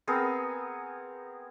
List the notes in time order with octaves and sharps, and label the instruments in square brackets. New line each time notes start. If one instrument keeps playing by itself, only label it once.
[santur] B3 C4 G#4 A#4